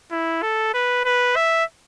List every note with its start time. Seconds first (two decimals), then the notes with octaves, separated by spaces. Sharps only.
0.12 E4
0.43 A4
0.74 B4
1.05 B4
1.36 E5